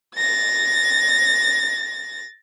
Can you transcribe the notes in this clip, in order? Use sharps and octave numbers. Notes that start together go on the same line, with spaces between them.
A6 A#6